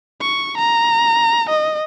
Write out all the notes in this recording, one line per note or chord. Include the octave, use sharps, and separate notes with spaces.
C#6
A#5
D#5